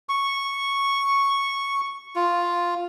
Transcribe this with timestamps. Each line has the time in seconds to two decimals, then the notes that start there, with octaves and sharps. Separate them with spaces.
0.09 C#6
2.16 F4